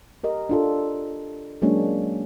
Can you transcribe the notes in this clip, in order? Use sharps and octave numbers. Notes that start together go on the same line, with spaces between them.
G4 A#4 D#5
D4 F4 A4
F#3 G#3 A#3 C#4 D4 C#5